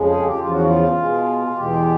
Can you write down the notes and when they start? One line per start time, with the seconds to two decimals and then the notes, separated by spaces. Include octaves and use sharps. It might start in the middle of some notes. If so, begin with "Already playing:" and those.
Already playing: F2 C#3 F3 G#3
0.09 G#4
0.25 G4
0.38 E2 C#3 F3 F4
0.51 F#4
0.63 F4
0.96 B2 G#3
1.54 E2 B2 G#3 G4